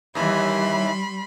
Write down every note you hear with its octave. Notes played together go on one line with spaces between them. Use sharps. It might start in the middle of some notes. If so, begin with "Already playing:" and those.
D#2 E3 G3 B5 C6